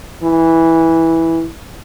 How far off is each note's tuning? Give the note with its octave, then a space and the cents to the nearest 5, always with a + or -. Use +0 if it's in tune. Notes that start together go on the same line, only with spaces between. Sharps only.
E3 -10